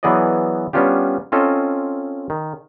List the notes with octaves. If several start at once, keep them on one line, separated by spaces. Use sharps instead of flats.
E3 F#3 B3 G#4 D5 D#5
G3 B3 C#4 D4 F4 G4
C4 C#4 F4 A4 D#5
D#3